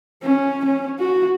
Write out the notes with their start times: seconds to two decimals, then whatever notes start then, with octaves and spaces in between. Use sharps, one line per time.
0.22 C#4
0.65 C#4
0.99 F#4